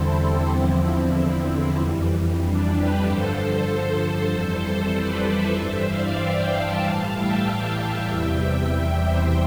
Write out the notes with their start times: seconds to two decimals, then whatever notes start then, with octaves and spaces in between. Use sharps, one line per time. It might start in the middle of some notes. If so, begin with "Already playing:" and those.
Already playing: E2 D3 G3 C4 E4 A4 C5
0.51 E2 D3 F3
1.78 F2 E3 G3
2.41 D4
2.72 G4 B4
3.03 G2 D3 F3 A4 C5
3.35 A4 C5
4.30 F2 E3 G3
4.93 B4 D5
5.24 C5 E5
5.56 G2 E3 G3 C5 E5
5.87 D5 F5
6.20 E5 G5
6.51 F5 A5
6.82 A2 E3 G3 F5 A5
7.14 E5 G5
8.08 E2 C3 E3 G3
8.71 E5 G5
9.03 C5 E5